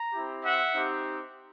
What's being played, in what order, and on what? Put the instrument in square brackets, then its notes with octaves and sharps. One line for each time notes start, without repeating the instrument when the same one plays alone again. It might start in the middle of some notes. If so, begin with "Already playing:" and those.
Already playing: [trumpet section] A#5
C4 E4 G4
E5 F#5
C4 D#4 G4